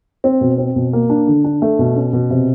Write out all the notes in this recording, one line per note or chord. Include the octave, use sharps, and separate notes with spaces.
C4
B2
C4
B2
A#3
D4
D3
D4
A3
B2
C#4
B2
C3